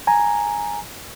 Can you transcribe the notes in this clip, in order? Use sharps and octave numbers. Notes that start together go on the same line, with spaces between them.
G#5 A#5